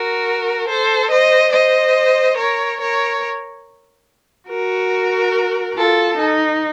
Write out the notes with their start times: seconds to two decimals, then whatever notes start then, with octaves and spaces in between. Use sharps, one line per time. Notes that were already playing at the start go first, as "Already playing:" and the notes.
Already playing: F#4 A#4
0.68 A4 C5
1.10 C5 D#5
1.52 C5 D#5
2.37 A#4 C#5
2.80 A#4 C#5
4.49 F#4 A#4
5.76 F4 A4
6.17 D#4